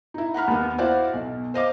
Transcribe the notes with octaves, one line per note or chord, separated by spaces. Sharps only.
D#4 E4
F#5 A#5 B5 F6
D#2 B3
E4 F#4 C5 D5 F5
B1 B2
C5 D#5 F5 D6